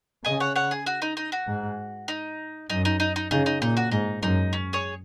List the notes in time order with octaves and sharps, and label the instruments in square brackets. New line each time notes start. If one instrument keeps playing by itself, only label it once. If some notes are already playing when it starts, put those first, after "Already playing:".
[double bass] C#3 [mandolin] D#5 G#5
[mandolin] C#5 F#5
C#5 F#5
G#4
F#4
D#4
D#4
F#4
[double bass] G#2
[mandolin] D#4
[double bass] F#2 [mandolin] D#4
[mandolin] D#4
D#4
D#4
[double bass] C#3 [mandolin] D#4
[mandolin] D#4
[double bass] A#2 [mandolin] D#4
[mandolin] F#4
[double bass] G#2 [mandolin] D#4
[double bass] F#2 [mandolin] D#4
[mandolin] C#4
G#4 C#5